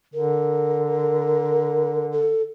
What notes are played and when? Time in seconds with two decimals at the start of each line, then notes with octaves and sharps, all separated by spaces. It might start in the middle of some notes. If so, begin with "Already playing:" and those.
0.14 D3 A#4
2.13 A4